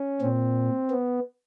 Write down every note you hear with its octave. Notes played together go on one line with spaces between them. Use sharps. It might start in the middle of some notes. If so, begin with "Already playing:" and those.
Already playing: C#4
A#2 C4
B3